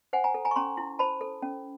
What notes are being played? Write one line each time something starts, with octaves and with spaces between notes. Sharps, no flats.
C5 F#5 G#5
G#5 A#5
A4
G#5 A#5
C#6
C#4 A#5 C6
E4
C5 A5 B5
A4
C#4